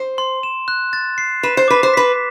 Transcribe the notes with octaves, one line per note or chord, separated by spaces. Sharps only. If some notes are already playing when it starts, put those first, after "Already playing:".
Already playing: C5
C6
E7
F#6
A6
C7
B4 E7
C5
B4 D6
C5
B4 B6